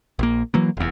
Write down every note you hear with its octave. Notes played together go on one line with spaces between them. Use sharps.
A#1 A#3
E3 F#3 A#3
F1 E2